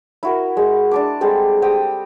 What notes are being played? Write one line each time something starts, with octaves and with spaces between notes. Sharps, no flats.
E4 F#4 A#4
G#3
D4 A5 D6
G3 G#3 C4 A4
C4 G4 G5 D#6